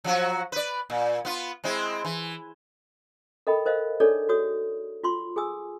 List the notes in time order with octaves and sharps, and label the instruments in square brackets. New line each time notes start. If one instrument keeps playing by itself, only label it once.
[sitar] F3 F#3 F#4
B4 D5
A#2
B3 F4
G#3 C4 E4
E3
[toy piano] A4 A#4 D#5 G5 B5
A#4 C5 D#5 F5
D4 D#4 G#4 A4 C#5 D5
F#4 A4 C#5 D#6
F4 C6 C#6
G#4 G#5 D#6 E6